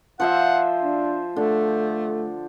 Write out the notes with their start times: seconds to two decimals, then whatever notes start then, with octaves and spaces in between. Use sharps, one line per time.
0.20 F3 C5 E5 F#5
0.82 D4
1.36 D3 A3